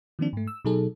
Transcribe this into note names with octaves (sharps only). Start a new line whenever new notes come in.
D#3 F3 A#3 C4 D4
G#2 A3
E6
B2 F#3 D#4 G#4 A4